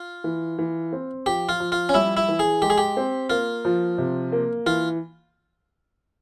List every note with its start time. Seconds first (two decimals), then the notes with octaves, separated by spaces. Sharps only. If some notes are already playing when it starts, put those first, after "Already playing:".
Already playing: F4
0.24 E3
0.58 E3
0.93 C4
1.26 F3 G4
1.49 F4
1.60 F3
1.72 F4
1.89 C#4
1.94 G3 E4
2.17 E4
2.28 E3
2.39 G#4
2.62 G#3 G4
2.70 G#4
2.78 G4
2.97 C4
3.30 A#3 F4
3.65 F3
3.98 C3
4.32 A#3
4.66 E3 F4